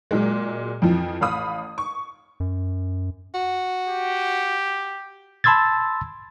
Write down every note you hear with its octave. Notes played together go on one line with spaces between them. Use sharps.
A#2 F#3 G#3
F2 E3 F3
A1 F5 B5 D#6
C#6
F#2
F#4
G4
A5 B5 C6 E6 G#6 A6